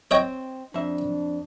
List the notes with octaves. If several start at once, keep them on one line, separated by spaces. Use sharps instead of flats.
C4 C#5 D#5 G5
F2 D4 E5